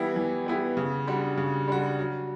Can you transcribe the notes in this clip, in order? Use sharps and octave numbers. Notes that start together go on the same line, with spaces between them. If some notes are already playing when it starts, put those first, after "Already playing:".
Already playing: E3 G3 B3 E4 G4
E3
G3 B3 E4 G4
C#3
G3 D4 F#4
C#3
G3 D4 F#4
F#3